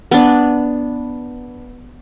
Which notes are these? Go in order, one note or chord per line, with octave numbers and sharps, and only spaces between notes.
B3 D4